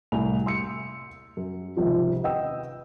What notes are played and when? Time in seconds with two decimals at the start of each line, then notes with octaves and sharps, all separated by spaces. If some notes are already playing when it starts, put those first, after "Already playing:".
0.12 C2 A2 G#5 F7
0.46 C6 E6 C#7
1.37 F#2
1.76 G#1 C#2 C3 F3 F4
2.24 B4 D#5 F#5 G5 E6